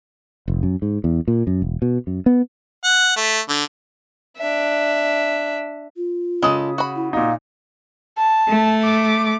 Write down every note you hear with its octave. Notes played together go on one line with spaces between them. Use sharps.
F1
F#2
G#2
E2
A#2
F#2
E1
B2
F#2
B3
F#5
A3
D3
D4 E5
F4
C#3 G#3 A4 D#6
F#4 B5
E4
A#2 D#4 F5
A5
A3
D6